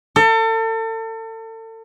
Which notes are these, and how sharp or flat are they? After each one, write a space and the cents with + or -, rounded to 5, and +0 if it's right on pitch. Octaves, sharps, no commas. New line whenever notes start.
A4 +35